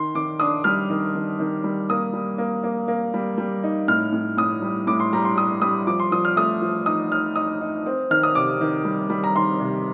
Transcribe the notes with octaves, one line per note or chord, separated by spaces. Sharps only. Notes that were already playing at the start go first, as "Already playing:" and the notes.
Already playing: D#3 C6
D#3 D6
D4 D#6
G3 F6
D#3
D#3
D#3
G3
A#3 D#6
G3
A#3
A#3
A#3
G3
G3
D#4
A2 F6
A2
A2 D#6
G3
A2 D6
C6
G3 A#5
C6
G3 D#6
G3 D#6
F3 D6
C6
F3 D#6
F6
A3 D#6
F3
D#4 D#6
D#4 F6
D#4 D#6
D#4
C4
D#3 F6
D#6
C3 D6
D#3
G3
G3
A#5
D#3 C6
C3